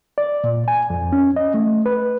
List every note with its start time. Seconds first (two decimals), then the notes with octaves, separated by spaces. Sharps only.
0.18 D5
0.44 A#2
0.68 G#5
0.90 F2
1.12 C#4
1.36 D#5
1.54 A3
1.86 B4